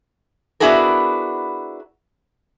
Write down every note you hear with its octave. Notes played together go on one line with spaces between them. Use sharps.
B3 D4 E4 F#4 G#4 A#4